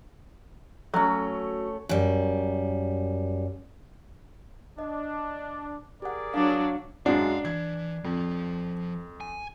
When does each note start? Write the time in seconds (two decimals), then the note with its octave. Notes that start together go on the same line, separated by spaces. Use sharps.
0.94 F#3 A3 C#4
1.89 F#2 G3
4.79 D4 D#5
6.02 G4 G#4 A#4 D5 F#5
6.34 F#3 D4 F5
7.06 F#2 G#3 D4 F5 F#5
7.45 E3 G#6
8.04 F2 F3
9.21 G#5